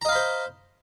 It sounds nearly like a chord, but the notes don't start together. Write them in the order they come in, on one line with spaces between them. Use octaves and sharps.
A#5 D#5 F5 B5 C5